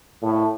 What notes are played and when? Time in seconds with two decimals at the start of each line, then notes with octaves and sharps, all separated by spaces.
0.22 A2